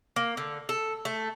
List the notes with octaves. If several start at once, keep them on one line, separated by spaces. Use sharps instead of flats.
A#3
D3
A4
A3